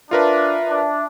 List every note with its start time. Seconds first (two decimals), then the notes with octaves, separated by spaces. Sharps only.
0.11 D4 F4 A#4 B4 E5
0.68 D4